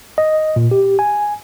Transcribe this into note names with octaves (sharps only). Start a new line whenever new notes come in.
D#5
A#2
G4
G#5